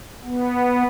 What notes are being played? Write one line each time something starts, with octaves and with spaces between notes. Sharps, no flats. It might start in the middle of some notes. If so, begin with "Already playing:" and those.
B3